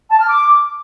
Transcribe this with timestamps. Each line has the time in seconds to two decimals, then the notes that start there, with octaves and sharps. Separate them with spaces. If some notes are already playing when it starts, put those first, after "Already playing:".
0.10 A5
0.19 F6
0.28 D6